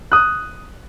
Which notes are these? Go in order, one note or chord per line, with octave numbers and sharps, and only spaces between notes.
D#6 F#6